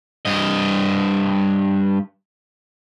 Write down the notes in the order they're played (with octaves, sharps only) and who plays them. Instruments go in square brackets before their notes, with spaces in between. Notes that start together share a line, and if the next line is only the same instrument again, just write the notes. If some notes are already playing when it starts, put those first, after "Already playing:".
[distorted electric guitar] G2 D#5